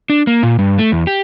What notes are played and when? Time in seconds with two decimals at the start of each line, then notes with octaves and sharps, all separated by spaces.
0.10 D4
0.27 A#3
0.43 A#2
0.59 G2
0.79 A3
0.92 E2
1.07 G4